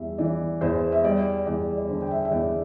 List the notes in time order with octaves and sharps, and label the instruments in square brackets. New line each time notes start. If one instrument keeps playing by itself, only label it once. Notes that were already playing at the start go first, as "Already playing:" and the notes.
Already playing: [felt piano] E2 G3 E5
E3 D5
E2 C5
E5
G3 D5
E2 D5
D5
D3 C5
G5
E5
E5
E2 D5